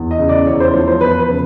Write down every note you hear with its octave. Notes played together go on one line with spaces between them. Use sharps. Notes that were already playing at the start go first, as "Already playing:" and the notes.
Already playing: E2
D#5
C#3
D5
E2 C#5
C5
F3 C#5
C5
E2 B4
B4
C#3